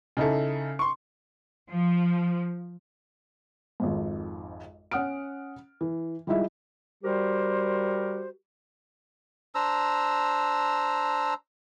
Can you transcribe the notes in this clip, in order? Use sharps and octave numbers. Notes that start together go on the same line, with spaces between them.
C#3 D#4 E4 A4
C6 C#6
F3
G#1 F2 G#2
C#4 F#5 D#6 F6 D7
E3
F3 G3 G#3 D#4 E4 E5
G3 F#4 G4 A#4 C5
D4 C5 A#5 E6